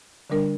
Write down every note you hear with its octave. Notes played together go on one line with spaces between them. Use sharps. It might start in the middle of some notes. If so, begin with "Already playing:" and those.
D3 G3 D4 A#4